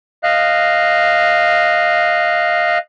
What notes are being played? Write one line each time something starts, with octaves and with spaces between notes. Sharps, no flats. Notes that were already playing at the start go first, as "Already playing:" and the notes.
D#5 F5 F#6